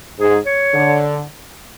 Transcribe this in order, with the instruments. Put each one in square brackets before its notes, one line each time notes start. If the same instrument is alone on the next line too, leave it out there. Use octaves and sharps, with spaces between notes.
[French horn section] G#2 [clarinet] G#4
[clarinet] C#5
[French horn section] D3